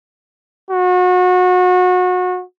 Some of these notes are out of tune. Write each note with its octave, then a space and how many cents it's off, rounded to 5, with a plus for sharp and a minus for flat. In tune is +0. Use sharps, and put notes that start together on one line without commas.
F#4 -30